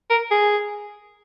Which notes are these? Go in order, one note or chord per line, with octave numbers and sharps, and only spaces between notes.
A#4
G#4